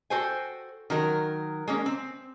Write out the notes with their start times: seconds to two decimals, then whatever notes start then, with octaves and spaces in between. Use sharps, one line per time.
0.10 F#4 A4 C5 G5 G#5
0.90 D#3 F#3 A#4
1.68 G#3 A#3 C#4
1.86 C4